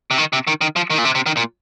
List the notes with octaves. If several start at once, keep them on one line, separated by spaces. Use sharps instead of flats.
C3
D#3
C3
D#3
D#3
F3
D#3
A#2
C3
C3
D#3
A#2